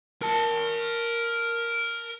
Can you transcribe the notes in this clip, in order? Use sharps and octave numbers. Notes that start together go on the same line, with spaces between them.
A#4 A5